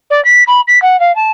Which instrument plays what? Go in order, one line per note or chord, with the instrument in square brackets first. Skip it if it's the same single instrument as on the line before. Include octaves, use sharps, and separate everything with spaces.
[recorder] D5
B6
B5
B6
F#5
F5
A5